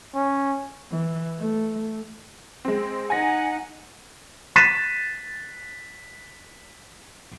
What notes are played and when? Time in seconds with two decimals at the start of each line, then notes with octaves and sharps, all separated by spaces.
0.15 C#4
0.91 E3
1.39 A3
2.65 G#3 C4
3.10 D#4 F#5 G#5 A#6
4.56 F#6 A6 B6 D#7 E7